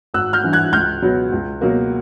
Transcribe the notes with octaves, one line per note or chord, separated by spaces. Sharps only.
G#1 E6 F#6
F6 G6
G2 E3
F#6 G#6
C#2 F6 G6
B2 F#3 B3
C#2
B2 F#3 A#3